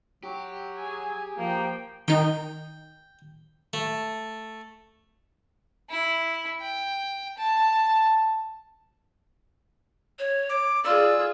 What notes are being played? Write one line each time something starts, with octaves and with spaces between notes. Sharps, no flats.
F#3 G4
G#4 G#5
F3 A#3 G5
D#3 D#4 G5
A3
E4
G5
A5
C#5
D6
F4 G#4 D5 E6